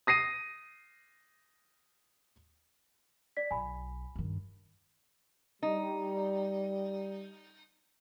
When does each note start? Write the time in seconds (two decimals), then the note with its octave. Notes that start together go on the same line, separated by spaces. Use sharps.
0.07 D#6 A#6 C7 D#7
3.37 D5 B6
3.51 B1 G#5 B5
4.16 G2 D#3
5.63 G3 D#4